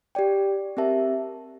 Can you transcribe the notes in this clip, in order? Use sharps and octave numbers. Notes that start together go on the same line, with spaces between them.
G4 D5 G5
C4 G4 A#4 E5 A5